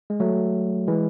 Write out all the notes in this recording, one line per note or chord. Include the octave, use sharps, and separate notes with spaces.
G#3
F#3 A3
E3 G#3